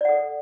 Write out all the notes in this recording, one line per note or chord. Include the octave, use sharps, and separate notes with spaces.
A4 D5 F#5